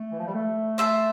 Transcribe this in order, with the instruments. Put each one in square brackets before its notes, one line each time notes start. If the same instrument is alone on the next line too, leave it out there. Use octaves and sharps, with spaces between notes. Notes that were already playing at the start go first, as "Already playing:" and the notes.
Already playing: [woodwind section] A3
E3
F3
G3
A3
[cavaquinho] C5 E5 A5 C6